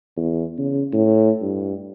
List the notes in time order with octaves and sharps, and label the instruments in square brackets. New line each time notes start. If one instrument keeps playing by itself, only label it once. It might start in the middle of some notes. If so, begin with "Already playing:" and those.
[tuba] E2
C#3
A2
G2